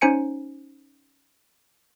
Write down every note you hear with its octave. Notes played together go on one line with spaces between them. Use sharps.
C#4 D#4 C5 G#5 C#7 D7